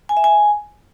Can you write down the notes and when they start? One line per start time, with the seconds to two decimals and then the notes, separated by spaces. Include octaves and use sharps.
0.09 G#5
0.17 E5
0.24 G#5